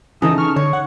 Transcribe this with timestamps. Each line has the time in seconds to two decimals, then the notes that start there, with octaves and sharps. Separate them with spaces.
0.22 C#3 E3 D#4 A4 D#6
0.38 C#6 F6
0.56 D3 C#5 C#6
0.73 F#5